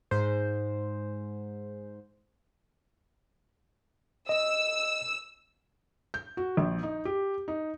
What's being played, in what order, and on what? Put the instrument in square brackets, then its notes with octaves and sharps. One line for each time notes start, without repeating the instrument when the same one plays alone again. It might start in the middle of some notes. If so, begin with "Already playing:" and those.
[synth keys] G#2 C5
[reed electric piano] D#5 [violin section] E6
[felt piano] G6
F#4
A#1
D#4
G4
D#4